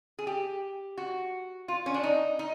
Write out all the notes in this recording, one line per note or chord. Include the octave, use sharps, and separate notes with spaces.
G#4
G4
F#4
F4
C#4
D4
D#4
D#4